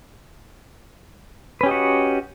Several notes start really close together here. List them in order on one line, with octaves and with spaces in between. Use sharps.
B4 C#4 G4 D#5 F#4